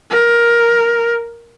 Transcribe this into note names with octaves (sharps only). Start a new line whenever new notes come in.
A#4